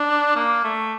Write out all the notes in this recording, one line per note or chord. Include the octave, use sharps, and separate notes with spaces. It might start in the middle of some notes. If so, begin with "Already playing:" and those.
Already playing: D4
A#3
A3